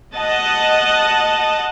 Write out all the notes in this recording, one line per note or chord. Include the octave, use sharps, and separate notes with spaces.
D#5 F#5 A5